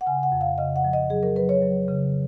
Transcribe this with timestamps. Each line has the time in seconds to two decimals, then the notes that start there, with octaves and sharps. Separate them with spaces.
0.01 F#5
0.07 C#3 G#5
0.23 F#5
0.32 F2
0.41 F5
0.58 C#3 D#5
0.76 F#5
0.84 F3
0.93 D#5
1.10 F#3 G#4
1.23 A#4
1.36 F#3 B4
1.49 C#5
1.62 F#3
1.88 C#3